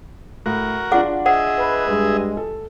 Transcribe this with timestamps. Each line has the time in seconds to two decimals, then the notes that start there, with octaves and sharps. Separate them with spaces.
0.46 A2 F#4 A#4
0.91 D4 F4 G#4 D5 F#5 D6
1.26 G#4 C5 D#5 E5 F#5
1.58 B4
1.88 G2 G#3
2.37 A4